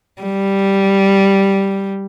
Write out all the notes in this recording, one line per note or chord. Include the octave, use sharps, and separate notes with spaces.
G3